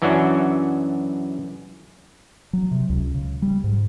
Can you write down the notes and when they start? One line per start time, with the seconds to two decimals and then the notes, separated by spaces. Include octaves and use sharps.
0.02 F#2 E3 C#4 D4 F#4
2.53 F#3
2.71 C3
2.89 C#2
3.14 C#3
3.42 G3
3.64 G#2